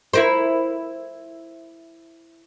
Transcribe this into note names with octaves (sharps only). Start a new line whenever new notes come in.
E4 A#4 C5